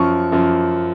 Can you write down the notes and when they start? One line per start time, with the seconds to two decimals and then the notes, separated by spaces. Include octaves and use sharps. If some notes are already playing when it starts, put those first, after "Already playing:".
Already playing: F#2 F3 C#6
0.32 F#2 F3